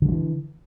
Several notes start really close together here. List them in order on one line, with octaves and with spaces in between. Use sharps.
D3 G3 F#3 E3